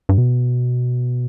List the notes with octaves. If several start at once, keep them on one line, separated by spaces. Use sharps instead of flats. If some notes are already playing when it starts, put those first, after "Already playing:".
G2
B2